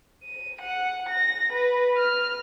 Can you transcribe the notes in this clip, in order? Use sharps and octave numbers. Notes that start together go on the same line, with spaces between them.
D#7
F#5
A#6
B4
F6